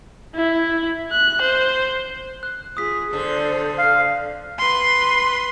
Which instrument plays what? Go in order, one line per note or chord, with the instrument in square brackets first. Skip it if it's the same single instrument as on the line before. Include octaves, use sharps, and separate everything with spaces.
[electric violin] E4
F#6
C5
[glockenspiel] F#6
[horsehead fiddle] F4 G#4 [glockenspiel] D#6 B6
[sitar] D3 [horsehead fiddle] A4 C5
[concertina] F5
[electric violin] B4 C6